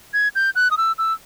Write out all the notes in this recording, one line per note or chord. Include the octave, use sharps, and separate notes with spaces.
G#6
G6
F#6
D#6
E6
E6